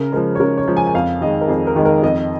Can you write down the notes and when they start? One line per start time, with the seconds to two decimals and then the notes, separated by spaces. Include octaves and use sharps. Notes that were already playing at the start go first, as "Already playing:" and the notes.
Already playing: C#3 A#4
0.12 F3 G#3 A#4
0.35 C#5
0.40 C#3 A#4
0.57 C#5
0.68 F3 G#3
0.77 G#5
0.87 G#5
0.94 F2 F5
1.21 D#3 G#3 D#5
1.41 A#4
1.48 F2 G#4
1.67 A#4
1.76 D#3 G#3
1.85 A#4
2.03 F2 D#5